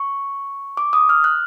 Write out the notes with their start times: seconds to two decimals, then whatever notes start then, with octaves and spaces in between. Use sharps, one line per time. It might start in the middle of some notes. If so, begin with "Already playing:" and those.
Already playing: C#6
0.77 D6
0.93 D#6
1.09 F6
1.24 F#6